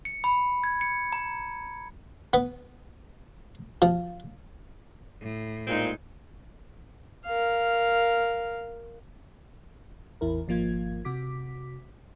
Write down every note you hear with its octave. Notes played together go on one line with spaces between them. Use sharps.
C#7
B5
G#6
C#7
A#5
B3
F3
A2
A#2 G#3 C4 D#4
A#4 F5
A1 E2 E4 A#4
G#1 F3 A#3 F4 G#6
C3 F#4 D6 B6